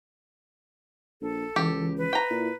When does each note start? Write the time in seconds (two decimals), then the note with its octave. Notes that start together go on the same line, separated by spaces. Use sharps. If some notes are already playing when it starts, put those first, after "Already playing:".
1.22 A#1 A4
1.56 C#2 E3 G4
1.98 B4
2.13 G5 A#5
2.31 A#2 E4